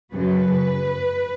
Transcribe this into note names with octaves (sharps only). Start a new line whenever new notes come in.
F#2 C#3 F#3 B4